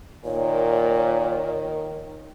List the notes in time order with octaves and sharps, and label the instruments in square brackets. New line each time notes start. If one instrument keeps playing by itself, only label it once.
[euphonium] A#2 [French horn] D#3 [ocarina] C#5